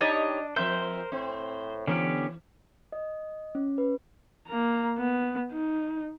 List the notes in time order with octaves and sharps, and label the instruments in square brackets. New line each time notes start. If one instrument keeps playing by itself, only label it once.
[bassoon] D4 [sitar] D#4 G4 C#5 [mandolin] D#5 A5
[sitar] F3 C4 E5 [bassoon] A#4 [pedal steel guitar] C5 [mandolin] G6
[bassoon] A2 [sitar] C4
[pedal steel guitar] D3 B3 G4 [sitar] E3 [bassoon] C#4
[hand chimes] D#5
C#4
B4
[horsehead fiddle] A#3 A#5
B3
D#4